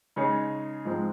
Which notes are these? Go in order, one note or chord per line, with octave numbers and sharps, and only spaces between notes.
C#3 G#3 D#4 G#4 C#5
G#2 F3 G#3 C4